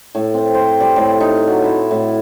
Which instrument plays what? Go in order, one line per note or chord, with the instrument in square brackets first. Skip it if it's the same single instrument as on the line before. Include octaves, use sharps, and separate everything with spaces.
[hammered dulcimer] A2
C4
C5
G3
A2
D#4
F#3
E4
A2